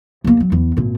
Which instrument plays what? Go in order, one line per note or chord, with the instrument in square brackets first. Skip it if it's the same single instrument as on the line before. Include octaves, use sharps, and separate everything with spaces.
[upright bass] D#2 A#3
F#3
E2
G#1 A#2